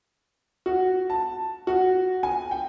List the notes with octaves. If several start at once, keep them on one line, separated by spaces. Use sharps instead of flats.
F#4
A5
F#4
G#5
G5